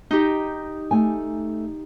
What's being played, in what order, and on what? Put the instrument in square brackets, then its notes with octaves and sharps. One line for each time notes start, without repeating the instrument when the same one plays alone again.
[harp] D#4 G4
[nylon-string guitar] A3 G#5